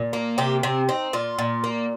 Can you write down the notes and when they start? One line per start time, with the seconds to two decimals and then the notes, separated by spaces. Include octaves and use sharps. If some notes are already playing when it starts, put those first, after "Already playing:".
Already playing: A#2
0.13 A#3
0.38 C3 G4
0.63 C3 C4
0.89 C4 D#4
1.13 A#2 F4
1.39 A#2
1.64 A#3